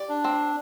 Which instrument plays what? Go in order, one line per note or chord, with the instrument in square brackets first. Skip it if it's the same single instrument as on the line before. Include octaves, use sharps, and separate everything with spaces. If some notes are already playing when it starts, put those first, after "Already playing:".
Already playing: [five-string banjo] G4 D5
[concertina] D4
[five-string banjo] C4